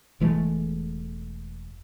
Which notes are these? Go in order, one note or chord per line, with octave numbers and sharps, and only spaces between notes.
E1 E3 G#3 A3